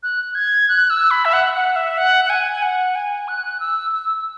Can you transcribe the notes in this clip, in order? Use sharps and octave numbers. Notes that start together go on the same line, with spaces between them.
F#6
G#6
F#6
E6
B5
E5
F#5
F#5
E5
F#5
F#5
G#5
G#5
F#5
G#5
F#6
E6
E6